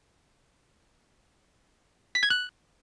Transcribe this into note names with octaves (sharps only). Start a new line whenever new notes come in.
B6
G#6
F#6